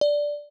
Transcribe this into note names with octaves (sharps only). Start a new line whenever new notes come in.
D5